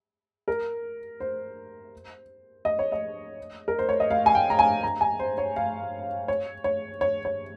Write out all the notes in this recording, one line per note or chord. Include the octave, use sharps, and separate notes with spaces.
A#4
C5
D#5
C#5
D#5
A#4
C5
C#5
D#5
F5
G#5
G5
A#5
G#5
A#5
G#5
C5
C#5
F5
C#5
C#5
C#5
C#5